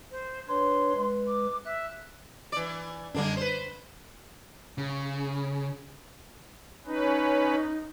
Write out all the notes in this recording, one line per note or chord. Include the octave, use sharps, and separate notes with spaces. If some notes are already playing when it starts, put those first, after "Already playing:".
C5
D4 B4 C#5 C6
G#3 B4
D6
E5 F#6
E3 D5
F#2 D3 G3 G#3 A#3 D4
B4 C5
C#3
C#4 D#4 B4